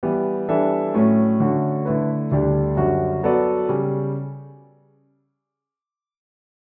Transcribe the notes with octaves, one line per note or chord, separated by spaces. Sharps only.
E3 G3 B3
E3 G3 D4 A4 E5
A2 F#3 A3 C#4
D3 A3 C#4 F#4
D3 A3 E4 B4
D2 D3 G3 D4 G4
F#2 D3 G3 C#4 F#4
F#3 B3 F#4 A4 D5
C#3 G3